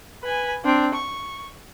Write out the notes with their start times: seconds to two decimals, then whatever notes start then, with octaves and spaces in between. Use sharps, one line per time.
0.23 B4 G#5
0.64 C4 D4
0.95 C#6